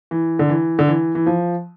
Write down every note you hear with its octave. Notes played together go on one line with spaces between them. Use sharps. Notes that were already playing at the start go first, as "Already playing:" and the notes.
E3
D3
E3
D3
E3
E3
F3